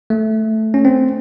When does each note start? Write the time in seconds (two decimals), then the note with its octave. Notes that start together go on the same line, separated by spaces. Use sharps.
0.10 A3
0.74 C#4
0.85 C4